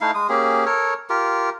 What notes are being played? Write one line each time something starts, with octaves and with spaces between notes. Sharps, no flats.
A3 D#4 E4 F5
G#3 D#6
A#3 C#4 G4 G#4
A4 A#4 C#5
F4 G4 A#4